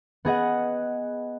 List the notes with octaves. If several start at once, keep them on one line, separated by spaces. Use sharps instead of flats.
B3 G#4 D#5 F#5